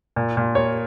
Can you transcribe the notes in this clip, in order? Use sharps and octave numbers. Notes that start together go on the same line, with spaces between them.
A#2
A#2
A#3 C#5